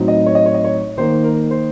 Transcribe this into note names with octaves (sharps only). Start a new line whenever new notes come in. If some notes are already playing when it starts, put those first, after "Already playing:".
Already playing: A2 F#3 C4 D#4
D#5
C#5
D#5
C#5
D#5
C#5
D#3 A#3 D#4 C5
A#4
C5